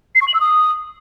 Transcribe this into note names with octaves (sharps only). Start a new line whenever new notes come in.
C7
C#6
F#7
E6
D#6